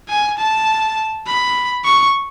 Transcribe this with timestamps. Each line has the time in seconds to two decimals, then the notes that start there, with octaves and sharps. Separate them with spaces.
0.09 G#5
0.38 A5
1.27 B5
1.85 C#6